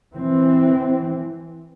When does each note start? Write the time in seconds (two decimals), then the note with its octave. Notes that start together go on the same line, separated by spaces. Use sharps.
0.12 E3 C4